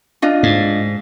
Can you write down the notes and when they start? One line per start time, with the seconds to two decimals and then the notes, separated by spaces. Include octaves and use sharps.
0.22 D4 F4 D#5
0.43 G#2